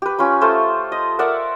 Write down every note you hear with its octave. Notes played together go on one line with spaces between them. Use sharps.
G4 B4
C#4 F4 B5
A3 F4 A4 C5
D#5
A#4 D5 E5 F#5